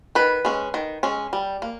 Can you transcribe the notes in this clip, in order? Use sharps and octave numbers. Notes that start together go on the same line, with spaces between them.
D#3 B4
G#3 C#4
D#3
G#3 C#4
G3
A#3